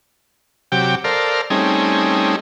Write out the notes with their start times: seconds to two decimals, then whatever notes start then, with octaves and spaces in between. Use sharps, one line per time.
0.72 C3 F#3 G4 G5 D6
1.04 A4 A#4 C5 D5 F5
1.50 G3 A3 C4 C#4 D#4 G#4